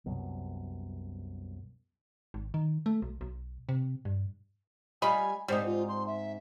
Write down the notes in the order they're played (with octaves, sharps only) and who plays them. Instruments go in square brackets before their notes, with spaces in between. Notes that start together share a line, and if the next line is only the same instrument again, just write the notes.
[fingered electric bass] C2 F#2 B2
[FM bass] G#1
D#3
A3
B1
B1
C3
G2
[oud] G3 F4 [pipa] D#5 B5 [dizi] G#5
[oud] G#2 C4 D#4 [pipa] G3 [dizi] C5
[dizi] F4
C6
E5